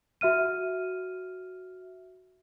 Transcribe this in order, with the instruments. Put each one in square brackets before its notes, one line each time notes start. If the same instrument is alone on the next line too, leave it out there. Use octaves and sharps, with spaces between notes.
[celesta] F#4 E5 F6 D#7